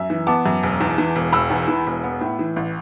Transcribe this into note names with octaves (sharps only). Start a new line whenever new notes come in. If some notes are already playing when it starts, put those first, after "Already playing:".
Already playing: F#2 E5
E3
B3 A5 D6
F#2
E1
E2
E3
E1
E1 B5 E6
E2
E3
E1
B3
A2
E3
A1